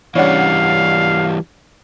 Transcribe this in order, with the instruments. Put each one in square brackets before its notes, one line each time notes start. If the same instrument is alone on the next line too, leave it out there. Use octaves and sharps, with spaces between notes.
[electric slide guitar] E3 G3 [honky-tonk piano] C#4 D4 F#5 [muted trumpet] F5